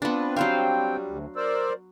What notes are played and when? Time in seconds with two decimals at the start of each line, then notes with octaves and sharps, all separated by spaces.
0.02 B3 C4 D4 F4 B4
0.37 F#3 G3 C4 C5 F5 G5
1.08 D2
1.36 A#4 C5 D5 E6